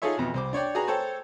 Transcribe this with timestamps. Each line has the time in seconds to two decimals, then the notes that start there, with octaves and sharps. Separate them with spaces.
0.02 D#4 F4 G#4 A4 C#5 E5
0.17 F2 B2 E3
0.34 C2 C5 D6
0.53 D4 C#5 D5 G5
0.75 F#4 G#4 B4 A#5
0.88 A4 C5 C#5 G5 A5